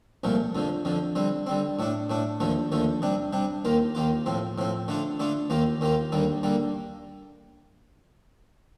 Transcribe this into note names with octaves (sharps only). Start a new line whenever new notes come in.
C2 A#2 F3 A3
F2 D3 F3
F2 D3 F3
D3 G3 C4
D3 G3 C4
A2 A3 D4
A2 A3 D4
D#2 D3 F3 A3
D#2 D3 F3 A3
C3 G3 D4
C3 G3 D4
D#2 D#3 A#3 F4
D#2 D#3 A#3 F4
A2 F3 C4
A2 F3 C4
D3 A3 D4 F4
D3 A3 D4 F4
D#2 D#3 A#3 F4
D#2 D#3 A#3 F4
D#2 D3 G3 A#3
D3 G3 A#3